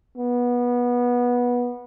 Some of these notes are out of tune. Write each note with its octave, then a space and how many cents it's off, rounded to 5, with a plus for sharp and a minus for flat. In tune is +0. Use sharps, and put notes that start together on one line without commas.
B3 -20